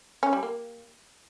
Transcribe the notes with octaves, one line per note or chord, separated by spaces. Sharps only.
C#4
G3
A#3